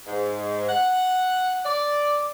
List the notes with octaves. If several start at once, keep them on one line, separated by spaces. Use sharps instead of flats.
G#2
F#5
D5